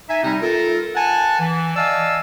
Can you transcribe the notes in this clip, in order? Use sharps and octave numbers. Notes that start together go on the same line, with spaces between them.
D#4 E5 G#5
C3 G3 C4 D#4
F4 A4 A#4
F#5 G#5 A5
E3
D5 D#5 F5 G#5 A5 E6